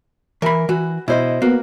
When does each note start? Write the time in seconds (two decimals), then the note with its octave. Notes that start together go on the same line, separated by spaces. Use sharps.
0.42 E3 A#4 B5
0.69 E3 F#4
1.08 B2 E4 C5 D#5
1.42 A#3 B3 F#4